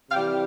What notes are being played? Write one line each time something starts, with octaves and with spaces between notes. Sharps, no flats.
C3 E3 G3 F5 G5